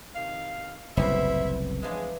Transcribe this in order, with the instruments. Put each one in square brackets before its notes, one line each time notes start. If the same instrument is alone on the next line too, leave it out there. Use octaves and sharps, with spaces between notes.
[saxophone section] C3 D#3 F5
[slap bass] F#1 C2 A2 [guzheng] B3 [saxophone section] E4 C5 E5
[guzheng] E3 F3 D4 [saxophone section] G#3